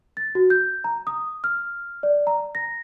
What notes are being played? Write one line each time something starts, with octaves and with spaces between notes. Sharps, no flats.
A6
F#4
G6
A#5
D#6
F6
D5
A#5
A#6